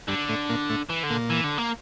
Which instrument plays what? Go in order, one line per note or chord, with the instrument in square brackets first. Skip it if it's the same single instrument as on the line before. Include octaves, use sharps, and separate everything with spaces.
[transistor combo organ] G2 G3 [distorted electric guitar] D3
[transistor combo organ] A2 A3
A#2 A#3
A2 A3
[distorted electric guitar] E3
D3
[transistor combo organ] A#2 A#3
[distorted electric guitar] E3
D3
A#3